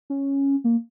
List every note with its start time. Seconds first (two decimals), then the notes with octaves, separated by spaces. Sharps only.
0.10 C#4
0.64 A#3